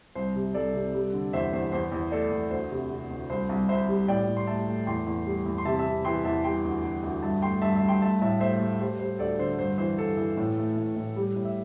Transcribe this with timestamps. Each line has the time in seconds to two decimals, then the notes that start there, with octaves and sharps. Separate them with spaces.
0.15 C2 C5
0.36 C3
0.54 C2 A4 D5
0.74 C3
0.94 G3
1.13 D3
1.33 E2 C5 E5
1.53 E2 C5
1.72 E2 C5
1.92 E2
2.11 A3 A4 D5
2.31 E2
2.51 D2 C5
2.71 C3
2.90 C3
3.11 D2
3.30 C2 C5
3.49 C2
3.69 C2 C5 E5
3.89 G3
4.08 A2 D5 G5
4.28 A2
4.37 C6
4.47 A3 E5 A5
4.67 A3
4.86 E2 G5 C6
5.07 E2
5.26 G3
5.46 E2
5.58 C6
5.65 C3 E5 A5
5.79 E5 A5
5.85 C3
6.04 E3 G5 C6
6.24 E2 E5 A5
6.44 G3 G5 C6
6.65 D2
6.83 D2
7.03 D2
7.22 G2 E5 A5
7.42 A3 G5 C6
7.62 G2 E5 A5
7.75 E5 A5
7.82 G2
7.88 G5 C6
8.02 A3 E5 A5
8.21 A2 E5 A5
8.40 A3 C5 E5
8.60 A3
8.80 G3 C5
8.99 G3 C5
9.19 D2 A4 D5
9.39 D3 C5
9.58 G2 C5
9.78 E3 C5
9.98 G2 A4
10.17 E3
10.37 A2
10.57 A3
10.77 A2
10.96 A2
11.16 G3
11.36 A2
11.45 E5